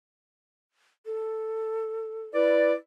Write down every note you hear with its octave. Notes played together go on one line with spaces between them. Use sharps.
A4
E4 B4 D5